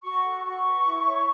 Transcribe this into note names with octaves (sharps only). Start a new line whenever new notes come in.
F#4 C#6
A4
F#4 C#6
B4
E4
C#5